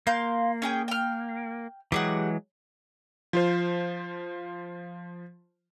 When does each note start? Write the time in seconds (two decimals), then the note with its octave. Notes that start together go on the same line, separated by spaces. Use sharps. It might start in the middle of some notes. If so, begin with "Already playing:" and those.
0.07 A#3 F5 C6 G6
0.62 C#4 G#4 G5
0.88 G5 F6
1.92 E3 F#3 G#3 G4 G#4 F#5
3.33 F3 F4 C5